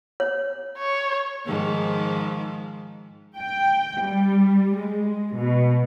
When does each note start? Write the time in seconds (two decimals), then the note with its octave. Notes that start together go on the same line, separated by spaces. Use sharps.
0.20 C#5
0.78 C#5
1.46 G#2 D#3 F3
3.40 G5
4.07 G3
4.78 G#3
5.38 B2